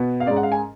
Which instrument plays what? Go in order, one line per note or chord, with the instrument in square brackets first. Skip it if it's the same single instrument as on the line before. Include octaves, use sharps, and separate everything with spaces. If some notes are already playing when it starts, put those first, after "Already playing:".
Already playing: [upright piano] B2 B3
F5
G#2 G#3 C#4 D5
F#5
F5
G#5